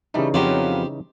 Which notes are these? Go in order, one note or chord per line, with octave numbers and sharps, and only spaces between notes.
C#3 E3 G3 A3 D#4
F2 F#3 B3 G4 C5 D5 F5